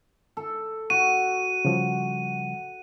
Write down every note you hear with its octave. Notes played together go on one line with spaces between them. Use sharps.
A4
F#4 D#7
C#3 F3 G3